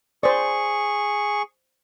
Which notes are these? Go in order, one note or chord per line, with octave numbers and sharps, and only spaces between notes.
G#4 C5 D5 C#6